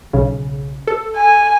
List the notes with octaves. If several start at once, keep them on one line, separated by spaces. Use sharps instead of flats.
B1 C#3
A4
G#5